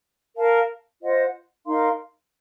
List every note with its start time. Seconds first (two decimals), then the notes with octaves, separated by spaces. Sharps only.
0.37 A#4 F5 A5
1.02 F4 C5 D#5 F#5
1.67 D#4 A#4 F5 C6